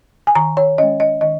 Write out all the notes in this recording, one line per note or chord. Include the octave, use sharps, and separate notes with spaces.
G#5
D#3 A#5
C#5
G#3 C#4 D#5
D#5
D#3 D#5